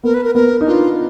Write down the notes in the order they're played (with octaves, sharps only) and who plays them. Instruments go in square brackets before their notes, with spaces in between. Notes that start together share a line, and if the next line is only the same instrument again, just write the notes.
[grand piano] B3 [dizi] A#4
[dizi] B4
A#4
[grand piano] B3 [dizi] A#4
[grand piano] D#4
[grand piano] D4 [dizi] F4